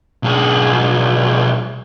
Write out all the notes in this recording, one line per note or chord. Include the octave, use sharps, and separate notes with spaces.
B1 G#4